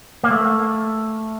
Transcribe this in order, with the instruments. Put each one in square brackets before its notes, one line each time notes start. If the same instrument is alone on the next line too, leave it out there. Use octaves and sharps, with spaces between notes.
[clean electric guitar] A#3
A3